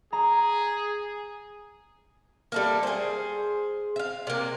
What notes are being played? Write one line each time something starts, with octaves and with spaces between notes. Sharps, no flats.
G#4 A#5
G3 A3 A#3
G#4 C5
E5 F5
C3 A#3